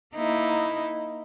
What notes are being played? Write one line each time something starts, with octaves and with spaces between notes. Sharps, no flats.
A#3 D#4 E4